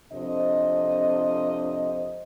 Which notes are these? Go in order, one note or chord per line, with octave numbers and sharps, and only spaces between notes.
F2 C3 D4 C5 D#5